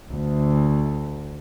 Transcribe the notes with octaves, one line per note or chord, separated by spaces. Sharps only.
D2